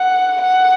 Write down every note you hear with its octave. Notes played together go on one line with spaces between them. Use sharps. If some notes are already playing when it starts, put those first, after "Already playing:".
Already playing: F#5
F#5